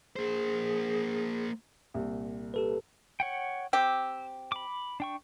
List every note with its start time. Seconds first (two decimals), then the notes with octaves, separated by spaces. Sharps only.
0.16 A#3 G#4 C5
1.94 C2 A#2
2.54 G4 A4 B4
3.20 C#5 F#5 G5
3.73 C4 G4 E6
4.52 B5 D6
5.00 D4 G5 C#6